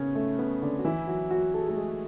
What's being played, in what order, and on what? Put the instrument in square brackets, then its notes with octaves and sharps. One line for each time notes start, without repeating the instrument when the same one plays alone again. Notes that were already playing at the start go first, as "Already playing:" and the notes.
Already playing: [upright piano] C#3 B3 C#4
A3
B3
D3 D4
F#4
E3 E4
F#3 F#4
F#3 F#4
A4
G#4
A3 A4
G#3 G#4